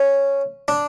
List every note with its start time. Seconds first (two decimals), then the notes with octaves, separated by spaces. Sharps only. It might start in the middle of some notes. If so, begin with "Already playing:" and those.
Already playing: C#4
0.68 D4